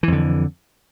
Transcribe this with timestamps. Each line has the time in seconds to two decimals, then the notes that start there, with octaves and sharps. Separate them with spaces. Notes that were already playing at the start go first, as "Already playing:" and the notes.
0.03 E3
0.08 F2
0.13 D3